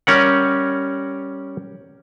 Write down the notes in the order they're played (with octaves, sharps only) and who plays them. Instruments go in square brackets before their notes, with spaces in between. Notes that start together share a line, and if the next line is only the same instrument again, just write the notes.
[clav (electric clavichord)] G3 C#4 A#4 F#5